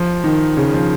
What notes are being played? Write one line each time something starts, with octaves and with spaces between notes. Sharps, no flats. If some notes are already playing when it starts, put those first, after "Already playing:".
Already playing: F3
D#3
C#3
F3